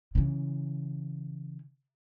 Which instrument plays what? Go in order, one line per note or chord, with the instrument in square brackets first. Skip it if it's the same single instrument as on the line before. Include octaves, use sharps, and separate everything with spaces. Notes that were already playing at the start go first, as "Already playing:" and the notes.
[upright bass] C#3 E3